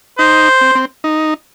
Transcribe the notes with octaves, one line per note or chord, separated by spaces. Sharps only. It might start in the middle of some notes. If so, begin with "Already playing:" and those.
D#4 C5
C4
C4
D#4